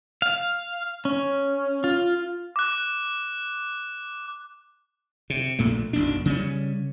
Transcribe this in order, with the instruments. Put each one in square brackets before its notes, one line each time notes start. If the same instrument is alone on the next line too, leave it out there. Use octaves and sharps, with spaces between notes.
[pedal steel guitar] F5
C#4
F4
[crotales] D6 F#6
[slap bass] C3
A#1 A#2 A3
F#1 B1 D4
C#3 G3 A#3 C#4